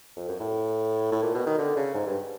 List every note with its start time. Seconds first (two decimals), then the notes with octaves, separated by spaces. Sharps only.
0.16 F2
0.28 F#2
0.40 A2
1.12 A2
1.23 A#2
1.35 B2
1.46 D#3
1.58 D3
1.77 C#3
1.94 G#2
2.06 G2